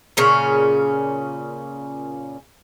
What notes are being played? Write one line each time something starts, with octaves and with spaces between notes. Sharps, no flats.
A#2 C#3 C#4